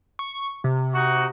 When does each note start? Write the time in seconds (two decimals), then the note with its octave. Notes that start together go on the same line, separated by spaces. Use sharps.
0.19 C#6
0.64 C3
0.95 D#4 F#4